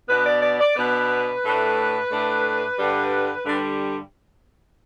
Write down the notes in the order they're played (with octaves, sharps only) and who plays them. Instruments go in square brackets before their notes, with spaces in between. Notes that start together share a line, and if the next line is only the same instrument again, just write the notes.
[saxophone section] B2 B3 D4 B4
D5
D5
D5
B2 B3 D4 B4
A2 A3 D4
A2 A3 D4
G2 D3 G3 D4
G2 D3 G3 D4